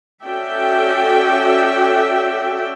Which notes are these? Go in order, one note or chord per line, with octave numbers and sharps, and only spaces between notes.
C#4 F#4 A4 D5 E5 G5